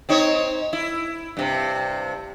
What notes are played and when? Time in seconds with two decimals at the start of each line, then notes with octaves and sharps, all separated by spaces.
0.09 C4 D#4 C#5
0.73 E4
1.37 G2 C3